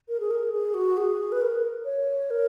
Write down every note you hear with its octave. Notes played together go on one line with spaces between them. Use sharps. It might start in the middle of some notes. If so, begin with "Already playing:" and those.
A#4
G#4
A#4
G#4
F#4
G#4
B4
A#4
C#5
A#4